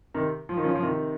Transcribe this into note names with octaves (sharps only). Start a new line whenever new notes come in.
C3 D#3
F3
D#3
C#3 F3
F3
C3 D#3